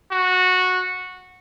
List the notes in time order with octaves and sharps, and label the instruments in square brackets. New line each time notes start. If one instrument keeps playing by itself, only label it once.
[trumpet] F#4